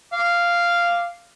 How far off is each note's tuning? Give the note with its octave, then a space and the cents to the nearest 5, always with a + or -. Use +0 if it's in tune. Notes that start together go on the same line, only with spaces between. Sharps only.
F5 -5 D6 +0